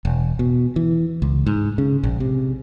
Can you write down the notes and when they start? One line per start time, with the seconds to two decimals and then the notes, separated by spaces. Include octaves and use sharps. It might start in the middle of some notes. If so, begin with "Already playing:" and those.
0.05 E1
0.39 B2
0.76 E3
1.22 C#2
1.46 G#2
1.78 C#3
2.03 A#1
2.20 C3